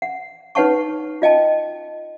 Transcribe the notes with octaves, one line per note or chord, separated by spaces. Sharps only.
F#5
D#4 B4 C#5 F#5 A5 C#6
F4 D#5 G5 A5